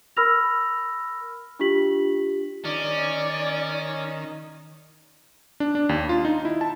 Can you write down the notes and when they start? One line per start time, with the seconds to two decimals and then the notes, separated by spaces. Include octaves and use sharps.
0.17 A#4 B5 E6 F6 A#6 F7
1.59 D4 F4 G4 B6 F#7
2.65 D#3 C#4 D5
5.60 D4
5.75 D4
5.89 D#2
6.09 F4
6.25 D#4
6.45 E4
6.61 A5